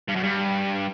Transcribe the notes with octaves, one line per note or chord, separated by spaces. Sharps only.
G2
F#2
G2